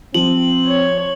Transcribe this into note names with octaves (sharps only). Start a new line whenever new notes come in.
F3 C4 F#7
C#5